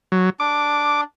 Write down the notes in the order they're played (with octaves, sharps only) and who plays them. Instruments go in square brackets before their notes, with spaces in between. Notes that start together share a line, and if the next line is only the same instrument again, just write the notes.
[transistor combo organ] F#3
[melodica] D4 [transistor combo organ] D6